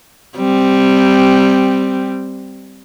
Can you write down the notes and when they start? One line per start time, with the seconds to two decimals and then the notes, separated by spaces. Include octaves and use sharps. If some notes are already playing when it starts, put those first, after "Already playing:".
0.37 G3 C4